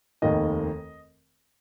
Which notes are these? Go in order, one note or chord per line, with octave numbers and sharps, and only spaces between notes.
F1 D#2 D#3 D#5